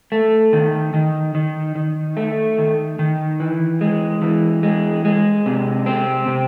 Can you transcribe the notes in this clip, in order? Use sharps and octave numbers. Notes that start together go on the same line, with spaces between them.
A3
D#3
D#3
D#3
D#3
A3
D#3
D#3
E3
G#3
E3
G#3
G#3
C3
C4
C3